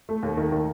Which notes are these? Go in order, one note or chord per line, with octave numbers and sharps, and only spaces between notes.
A3
D#2
D#3
D#3